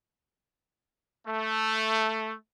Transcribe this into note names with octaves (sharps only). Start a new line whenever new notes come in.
A3